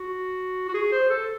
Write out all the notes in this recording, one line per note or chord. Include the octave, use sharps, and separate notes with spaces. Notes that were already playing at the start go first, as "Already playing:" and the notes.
Already playing: F#4
F#4
G#4
C5
A4